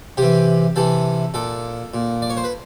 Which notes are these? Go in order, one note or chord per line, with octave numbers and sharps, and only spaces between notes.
C3 E3 G4
C3 E3 A4
A#2 A4
A#2
D5
C#5
C5
B4